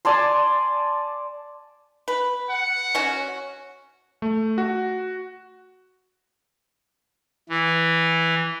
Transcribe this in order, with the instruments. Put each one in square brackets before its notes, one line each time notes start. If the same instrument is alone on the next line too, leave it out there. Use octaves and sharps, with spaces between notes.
[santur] D5 G#5 A5 C6
[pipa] B4
[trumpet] F#5
[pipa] C#4 F#4
[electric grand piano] A3
F#4
[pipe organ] E3